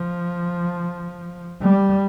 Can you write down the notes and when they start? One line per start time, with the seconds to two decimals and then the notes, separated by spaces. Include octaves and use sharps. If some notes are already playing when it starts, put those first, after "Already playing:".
Already playing: F3
1.62 G3